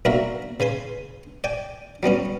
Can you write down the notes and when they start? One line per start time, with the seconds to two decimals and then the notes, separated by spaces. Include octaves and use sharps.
0.05 B1 A#3 D4 F#4 A#4 E5
0.60 C#3 B4 G#5 C6
1.44 D5 G5 G#5
2.03 F#3 G3 B3 C#4